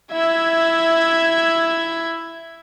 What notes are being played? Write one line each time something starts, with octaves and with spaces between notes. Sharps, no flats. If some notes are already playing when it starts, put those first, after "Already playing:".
E4 E5 G#6